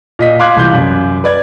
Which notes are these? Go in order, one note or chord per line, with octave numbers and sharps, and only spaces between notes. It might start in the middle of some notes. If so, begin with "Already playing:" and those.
A#2 D#5 B6
F5 C6 D6 F#6 G#6
C2 E3 F5 G6
F#2
B4 D5 G#6